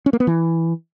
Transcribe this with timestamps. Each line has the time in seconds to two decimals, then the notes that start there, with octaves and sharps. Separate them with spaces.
0.06 C#4
0.13 A#3
0.20 B3
0.27 E3